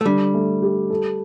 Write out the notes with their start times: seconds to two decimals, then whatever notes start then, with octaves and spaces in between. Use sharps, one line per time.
0.01 A3
0.06 D3 G3
0.34 A3
0.62 G4
0.90 A4